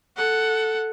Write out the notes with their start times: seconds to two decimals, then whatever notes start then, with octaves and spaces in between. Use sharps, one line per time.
0.16 A4 F#5